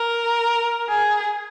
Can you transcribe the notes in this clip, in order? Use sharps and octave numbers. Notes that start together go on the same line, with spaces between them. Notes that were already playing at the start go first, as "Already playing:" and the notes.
Already playing: A#4
G#4